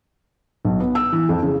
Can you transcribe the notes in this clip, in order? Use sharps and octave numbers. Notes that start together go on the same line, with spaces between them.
B1
B3
E6
E3
F2
C#3